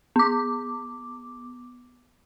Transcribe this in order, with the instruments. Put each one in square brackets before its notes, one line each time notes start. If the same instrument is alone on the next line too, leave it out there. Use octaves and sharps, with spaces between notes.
[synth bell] B3 D6